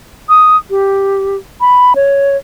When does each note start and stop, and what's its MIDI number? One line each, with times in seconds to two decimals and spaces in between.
0.29 0.57 87
0.70 1.36 67
1.61 1.93 83
1.96 2.37 73